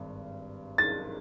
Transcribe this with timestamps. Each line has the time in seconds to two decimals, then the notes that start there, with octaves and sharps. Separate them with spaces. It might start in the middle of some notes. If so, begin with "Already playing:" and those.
Already playing: G#1 G2
0.78 A6